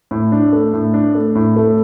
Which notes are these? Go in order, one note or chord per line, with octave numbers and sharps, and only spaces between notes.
A2
D4
A3
A2
D4
A3
A2
A3